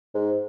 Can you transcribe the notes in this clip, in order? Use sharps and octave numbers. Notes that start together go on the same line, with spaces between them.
G#2